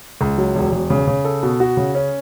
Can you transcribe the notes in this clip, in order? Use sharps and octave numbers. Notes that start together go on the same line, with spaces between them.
C#2
F#3
E1
E1
C#3
C#3
A4
B2
F#4
C#3
C#4